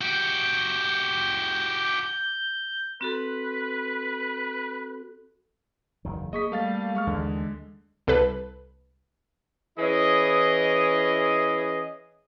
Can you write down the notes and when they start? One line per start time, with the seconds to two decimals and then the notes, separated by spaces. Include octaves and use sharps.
0.01 F#4 G4 G6
3.01 C4 F#4 A4 B4
6.05 F#1 E2 D#3
6.33 A#3 G#4 D#5 C#6 B6
6.52 G3 A3 F5 A6
6.95 G#3 F5 C#6 F6
7.07 D#2 D3 E3
8.07 C2 A4 B4
9.78 E3 C#4 E4 G#4 D#5